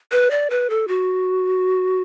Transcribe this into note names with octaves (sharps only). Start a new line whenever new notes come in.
B4
D5
B4
A4
F#4